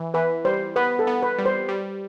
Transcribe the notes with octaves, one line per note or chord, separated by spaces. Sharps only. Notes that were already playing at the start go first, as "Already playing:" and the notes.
Already playing: E3
E3 B4
G3 C5
B3 B4
A4
B3
B4
G3
C5
G3